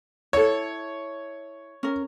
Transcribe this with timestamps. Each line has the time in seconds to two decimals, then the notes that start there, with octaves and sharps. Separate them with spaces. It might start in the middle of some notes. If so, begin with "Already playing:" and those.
0.33 E4 A4 C#5
1.83 C#4 A#4